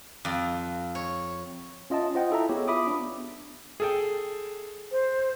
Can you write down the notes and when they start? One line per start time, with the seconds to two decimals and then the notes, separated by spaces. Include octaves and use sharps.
0.25 F2
0.95 C#5
1.90 C#4 F4 D#5 E5 A5
2.15 F4 C5 D#5 F#5 G5
2.31 E4 A4 E5 A#5
2.49 B3 G4 G#4 C#5
2.68 F4 E5 B5 D6 D#6
2.87 B3 D4
3.80 G#4 A4 G5
4.92 C5